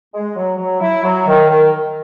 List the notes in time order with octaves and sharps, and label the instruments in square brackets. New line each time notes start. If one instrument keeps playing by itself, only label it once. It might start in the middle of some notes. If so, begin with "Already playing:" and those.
[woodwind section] G#3
F#3
F#3
E4
F#3
D#3
D#3